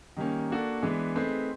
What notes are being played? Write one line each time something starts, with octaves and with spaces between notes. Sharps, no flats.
D#3 G3 A#3 C#4
A#3 D4 F#4 A4
E3 G#3 B3 D4
A3 C4 D#4 G#4 B4